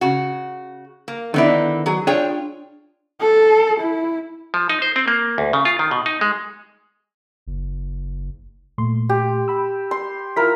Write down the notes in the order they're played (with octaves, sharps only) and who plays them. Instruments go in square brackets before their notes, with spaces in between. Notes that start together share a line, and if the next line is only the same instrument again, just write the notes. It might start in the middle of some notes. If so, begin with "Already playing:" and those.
[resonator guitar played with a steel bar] C#3 F#4
A#3
[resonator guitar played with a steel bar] D3 D#4 E4 [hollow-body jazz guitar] D#3 B3 D5
[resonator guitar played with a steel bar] F#3 G#4
[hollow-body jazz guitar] D4 F4 [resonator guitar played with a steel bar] G#4 C#5 G5
[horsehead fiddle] A4
E4
[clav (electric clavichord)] F3
D#4
C5
C4
A#3
D2
C#3
F4
D#3
B2
D#4
G#3
[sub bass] F#1
[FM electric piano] A#2 A3 C6
[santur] G4
[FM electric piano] G5 B5 E6
[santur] C6
[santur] E4 A#4 [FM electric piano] F4 E6 B6